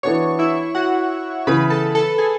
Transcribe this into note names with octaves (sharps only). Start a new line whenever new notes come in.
E3 B3 D4 F#4 C#5 C#6
E4 E5
F#4 F#5
C#3 E3 B3 B4 B5
A4 A5
A4 A5
G#4 G#5